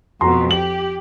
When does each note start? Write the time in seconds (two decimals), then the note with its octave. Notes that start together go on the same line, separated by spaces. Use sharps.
0.21 F2 B2 F#4 A#5 C6
0.51 G4 F#7